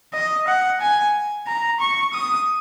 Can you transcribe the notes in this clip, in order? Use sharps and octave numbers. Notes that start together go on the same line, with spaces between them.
D#5
F#5
G#5
A#5
C#6
D#6